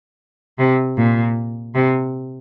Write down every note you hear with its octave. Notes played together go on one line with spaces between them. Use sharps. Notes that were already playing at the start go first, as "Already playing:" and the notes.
C3
A#2
C3